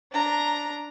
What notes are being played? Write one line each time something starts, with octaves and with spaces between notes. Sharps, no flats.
D4 A#5